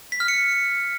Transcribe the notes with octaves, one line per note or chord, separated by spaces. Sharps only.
B6
F6
C#7